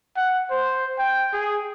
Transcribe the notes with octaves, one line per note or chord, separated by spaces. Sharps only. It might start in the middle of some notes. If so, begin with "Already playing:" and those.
F#5
C5
G5
G#4